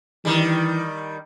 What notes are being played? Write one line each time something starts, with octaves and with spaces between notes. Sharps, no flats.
D#3 E3 G3